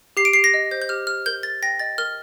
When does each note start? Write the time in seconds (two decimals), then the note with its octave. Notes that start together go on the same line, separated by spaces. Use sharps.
0.17 G4 C7
0.25 D7
0.33 G4 C7
0.44 A#6
0.54 D#5
0.71 C5 G6
0.82 G6
0.89 G4 F6
1.07 G4 F6
1.26 A#4 G6
1.43 A#4 A6
1.63 G5 A#6
1.80 D#5 A6
1.98 A#4 F6